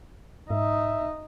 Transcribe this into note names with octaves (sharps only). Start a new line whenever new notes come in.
G#2 D#4 E5